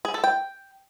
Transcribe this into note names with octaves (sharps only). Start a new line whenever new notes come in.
G#4
A4
G5